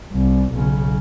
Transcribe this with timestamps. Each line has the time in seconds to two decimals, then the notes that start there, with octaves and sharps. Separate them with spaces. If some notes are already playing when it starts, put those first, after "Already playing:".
0.12 C2
0.52 B1 C#3